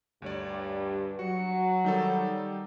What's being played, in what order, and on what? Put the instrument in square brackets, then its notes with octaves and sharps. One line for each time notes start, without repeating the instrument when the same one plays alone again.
[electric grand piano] D2 C#5 D5 [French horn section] G2
[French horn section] F#3 [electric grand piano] F#4 [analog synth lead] C#7
[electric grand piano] D#3 D#4 A4 [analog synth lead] G3